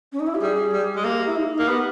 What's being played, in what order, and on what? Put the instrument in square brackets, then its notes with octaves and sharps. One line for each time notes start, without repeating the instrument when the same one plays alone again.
[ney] C#4
D#4
E4
G4
[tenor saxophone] G3 [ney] G#4
[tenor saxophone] G3
G#3
[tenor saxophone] A#3 [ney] G4
[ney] G4
E4
D#4
D#4
[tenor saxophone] A#3
[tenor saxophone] B3 [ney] G4